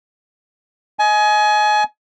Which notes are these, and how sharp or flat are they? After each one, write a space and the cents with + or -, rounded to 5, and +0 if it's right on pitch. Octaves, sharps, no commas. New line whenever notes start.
D#5 +15 G#5 +25